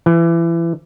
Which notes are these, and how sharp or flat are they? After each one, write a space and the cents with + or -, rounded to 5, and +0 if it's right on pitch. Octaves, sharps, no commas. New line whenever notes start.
E3 +25